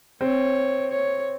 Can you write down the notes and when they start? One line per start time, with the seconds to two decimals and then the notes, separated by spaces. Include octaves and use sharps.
0.21 C4 C#5
0.91 C#5